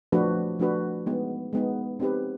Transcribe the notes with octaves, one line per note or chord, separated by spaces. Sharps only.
F3 A3 D4 F#4 B4
F3 A3 D4 F#4 B4
G#3 B3 D#4
G#3 B3 D#4
C4 D#4 G4 B4